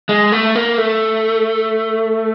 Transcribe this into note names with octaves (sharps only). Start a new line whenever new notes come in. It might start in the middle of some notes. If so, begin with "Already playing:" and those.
G#3
A3
A#3
A3